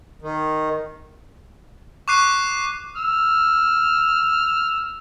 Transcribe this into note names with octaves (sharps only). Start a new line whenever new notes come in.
D#3
C#6 D6 F#6 C7 D#7
E6 F6